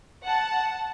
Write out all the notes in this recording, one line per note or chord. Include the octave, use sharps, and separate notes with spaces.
F#5 A5